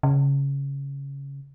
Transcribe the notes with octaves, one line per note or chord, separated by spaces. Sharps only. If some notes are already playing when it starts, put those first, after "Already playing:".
C#3